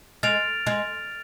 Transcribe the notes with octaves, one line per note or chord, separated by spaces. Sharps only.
G#3 F6 A6 D7 F7
G#3